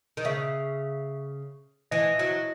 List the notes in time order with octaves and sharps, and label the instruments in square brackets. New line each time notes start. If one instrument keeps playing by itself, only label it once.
[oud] D#3
[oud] C#3 [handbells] E5
[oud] E3 [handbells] D#5
[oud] F#3